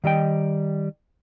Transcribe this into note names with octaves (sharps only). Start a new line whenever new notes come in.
D#3 G3 D#5 G5